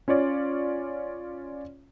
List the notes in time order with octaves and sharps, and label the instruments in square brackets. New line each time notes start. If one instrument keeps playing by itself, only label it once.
[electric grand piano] C#4 F4 C#5 D5